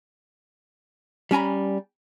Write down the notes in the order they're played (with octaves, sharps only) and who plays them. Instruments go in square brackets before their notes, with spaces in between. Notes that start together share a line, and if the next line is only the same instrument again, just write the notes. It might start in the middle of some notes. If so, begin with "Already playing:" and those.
[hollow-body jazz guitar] G3 C#4 G#5 A#5 B5